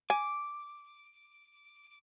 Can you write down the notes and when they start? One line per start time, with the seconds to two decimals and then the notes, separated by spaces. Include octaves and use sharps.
0.10 G#5 D6